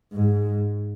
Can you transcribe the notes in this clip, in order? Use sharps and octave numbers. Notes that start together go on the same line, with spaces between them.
G#2